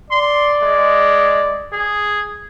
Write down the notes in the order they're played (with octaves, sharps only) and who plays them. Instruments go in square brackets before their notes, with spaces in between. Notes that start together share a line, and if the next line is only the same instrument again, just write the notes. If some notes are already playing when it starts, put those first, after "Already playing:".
[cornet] D5 [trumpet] C6
[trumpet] G#3
G#4